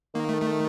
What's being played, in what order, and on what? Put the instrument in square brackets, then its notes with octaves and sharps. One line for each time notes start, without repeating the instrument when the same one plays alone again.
[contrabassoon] D#3 [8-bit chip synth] A#3
[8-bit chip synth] A3
A3